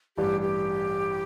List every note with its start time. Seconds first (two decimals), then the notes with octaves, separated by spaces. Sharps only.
0.17 A1 G2 G3 G4
0.41 G4